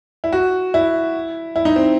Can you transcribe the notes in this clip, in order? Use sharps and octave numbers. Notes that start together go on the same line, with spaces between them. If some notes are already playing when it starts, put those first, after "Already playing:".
E4
F#4
E4
E4
D#4
C4